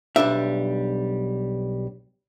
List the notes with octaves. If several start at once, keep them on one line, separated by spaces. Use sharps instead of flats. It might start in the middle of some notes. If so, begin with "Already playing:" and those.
B1 G3 D4 E5